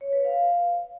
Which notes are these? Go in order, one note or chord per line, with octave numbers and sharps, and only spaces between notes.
C#5
B4
F5